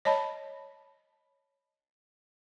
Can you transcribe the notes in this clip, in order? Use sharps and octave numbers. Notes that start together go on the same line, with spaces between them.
C#5 D#5 A5 B5